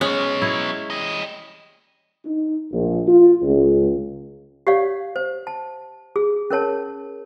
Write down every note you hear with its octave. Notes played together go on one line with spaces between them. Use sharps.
F#3 G#3 B3 C#4
E4 C#5
G3 D#5
D#4
A#1
F4
C#2
G4 C#5 D5 F5
C5
A5
G#4
C#4 A#4 C#5 A5